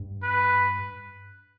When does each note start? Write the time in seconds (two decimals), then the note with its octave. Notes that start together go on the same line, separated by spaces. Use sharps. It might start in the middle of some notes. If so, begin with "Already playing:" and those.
Already playing: G2
0.23 B4